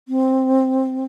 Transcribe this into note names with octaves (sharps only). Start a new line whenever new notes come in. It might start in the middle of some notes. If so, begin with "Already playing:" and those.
C4